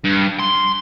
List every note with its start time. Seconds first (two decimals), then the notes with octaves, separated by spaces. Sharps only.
0.04 G2
0.39 C6